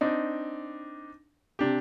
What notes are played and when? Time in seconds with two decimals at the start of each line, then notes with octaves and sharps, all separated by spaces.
0.01 C4 D4 D#4
1.59 C3 D4 G4